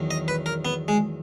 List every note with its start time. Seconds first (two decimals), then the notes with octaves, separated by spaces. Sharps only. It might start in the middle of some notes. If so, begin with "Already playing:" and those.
Already playing: E2 D#3 F#3
0.11 D#5
0.28 B4
0.46 A#4
0.65 B3
0.88 G#3